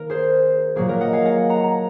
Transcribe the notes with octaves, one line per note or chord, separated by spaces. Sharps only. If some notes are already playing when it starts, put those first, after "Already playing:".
Already playing: D#3 A#3 A#4
G#4 C5
A#2 F#3 A#3 G#4
A#4
D#5 F#5
F5 G#5
D#5 F#5
F#5 A#5
A#5